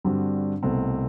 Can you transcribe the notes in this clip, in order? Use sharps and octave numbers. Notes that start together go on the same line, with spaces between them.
G2 D3 G3 C4 F#4
C2 B2 A3 C4